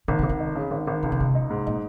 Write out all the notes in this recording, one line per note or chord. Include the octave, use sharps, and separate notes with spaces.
G#1 A#2
C3
G#1
C#3
D#4
C#3
G#1
G#1
C#2 C3
C#3
C#2 C3
D#4
G#2
A#2 D#4